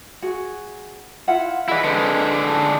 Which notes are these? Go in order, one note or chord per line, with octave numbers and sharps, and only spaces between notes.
F#4 G#4
E4 F4 F#5
E4 G#4 B4 D#5
D3 G#3 B4 C5